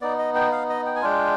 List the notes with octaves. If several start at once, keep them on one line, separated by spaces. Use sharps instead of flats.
B3 D#4 D5
D#5
G5
F5
D#5
G5
G#5
G#3 D4 F4 G5